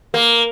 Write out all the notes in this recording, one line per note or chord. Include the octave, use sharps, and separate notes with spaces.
A#3